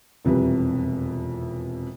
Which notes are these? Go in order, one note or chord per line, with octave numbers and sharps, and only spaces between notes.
E1 F2 C3 E3 G3 B4